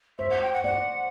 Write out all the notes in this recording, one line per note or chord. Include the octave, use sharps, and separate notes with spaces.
C5 E5
F#5
G5
F#5
D5 F#5